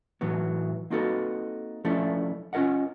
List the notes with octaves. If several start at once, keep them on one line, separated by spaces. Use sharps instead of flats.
A2 E3 F#3 B3
A#3 C4 D#4 F#4 A4 B4
F3 A3 C#4 D4 E4 A4
C#4 F4 A#4 D#5 F#5